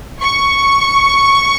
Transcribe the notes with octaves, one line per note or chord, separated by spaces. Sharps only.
C#6